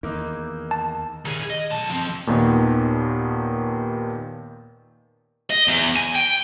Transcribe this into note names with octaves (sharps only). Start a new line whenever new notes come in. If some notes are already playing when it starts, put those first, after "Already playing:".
E2 D#3 A#3 D#4 D#5 D6
A5
D#3 G#4
D#5
B1 A5
F3 C4
D#2 A#2 D#3 B3
D#5
E2
G#5
G5